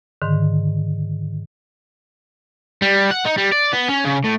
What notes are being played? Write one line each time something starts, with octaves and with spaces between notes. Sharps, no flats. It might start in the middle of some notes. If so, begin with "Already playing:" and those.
G#2 D3 D#3
G3
F#5
D#4
G3
D5
B3
C#4
C#3
A2